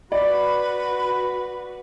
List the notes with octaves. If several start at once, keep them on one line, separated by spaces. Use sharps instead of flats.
F#4 B4 D5 B5